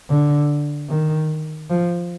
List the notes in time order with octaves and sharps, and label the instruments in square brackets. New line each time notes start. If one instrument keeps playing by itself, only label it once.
[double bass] D3
D#3
F3